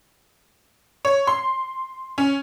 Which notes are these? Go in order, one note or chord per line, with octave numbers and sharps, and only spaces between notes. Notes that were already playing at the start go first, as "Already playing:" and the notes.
C#5
C6
C#4